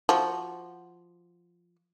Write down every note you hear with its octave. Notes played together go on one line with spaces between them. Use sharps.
F3 F#4